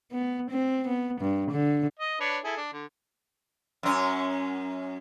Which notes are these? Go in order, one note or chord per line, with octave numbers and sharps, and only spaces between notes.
B3
C4
B3
G2
D3
D#5
D4 B4 C#5
E4 G#4 A4
D4
D3
F#2 C#4